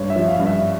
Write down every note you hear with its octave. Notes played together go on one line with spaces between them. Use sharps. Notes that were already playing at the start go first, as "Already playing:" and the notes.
Already playing: G2 C#5
E5
F3
F5
G2
E5